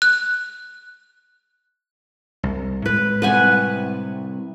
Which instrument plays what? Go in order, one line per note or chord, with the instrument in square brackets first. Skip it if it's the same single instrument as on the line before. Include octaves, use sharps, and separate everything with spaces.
[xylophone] F#6
[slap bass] C2
[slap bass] A2 G#3 [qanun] B4
[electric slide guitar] C3 G3 [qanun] B4 F#5 G#5